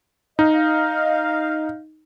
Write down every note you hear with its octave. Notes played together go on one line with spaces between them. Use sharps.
D#4 D#5 F5